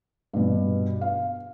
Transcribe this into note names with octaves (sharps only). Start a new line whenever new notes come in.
G2 B2
F5